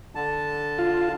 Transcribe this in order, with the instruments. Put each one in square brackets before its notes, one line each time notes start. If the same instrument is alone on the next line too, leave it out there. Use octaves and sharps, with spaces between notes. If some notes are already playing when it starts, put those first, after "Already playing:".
[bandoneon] D3 A5
[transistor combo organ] F4